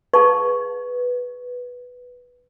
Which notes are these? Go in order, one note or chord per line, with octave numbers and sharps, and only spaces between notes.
G#4 B4 A5 C#6